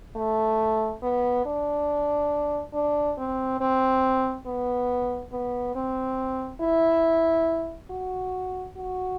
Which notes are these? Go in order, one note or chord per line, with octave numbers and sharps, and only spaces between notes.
A3
B3
D4
D4
C4
C4
B3
B3
C4
E4
F#4
F#4